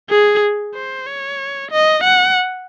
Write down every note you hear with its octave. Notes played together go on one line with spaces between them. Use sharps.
G#4
C5
C#5
D#5
F#5